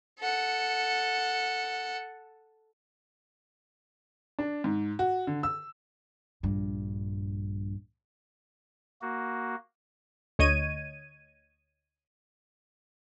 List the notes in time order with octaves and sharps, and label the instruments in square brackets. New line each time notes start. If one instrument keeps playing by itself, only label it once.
[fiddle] A4 F#5
[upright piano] D4
G#2
F#4
D3
E6
[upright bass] A#1 G2
[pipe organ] A#3 F#4
[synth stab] D2 C#5 D#5 G#6 D#7